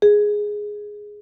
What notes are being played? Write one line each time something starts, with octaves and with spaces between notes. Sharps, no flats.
G#4